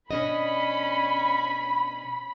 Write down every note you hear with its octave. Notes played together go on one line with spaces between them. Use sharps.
B2 C#4 D4 D#5 B5